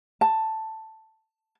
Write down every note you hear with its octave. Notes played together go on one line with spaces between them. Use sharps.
A5